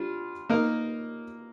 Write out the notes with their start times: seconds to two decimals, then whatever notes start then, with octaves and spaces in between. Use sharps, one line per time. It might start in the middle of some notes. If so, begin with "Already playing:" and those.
Already playing: G3 D4 F4
0.49 A#3 D#4 A#4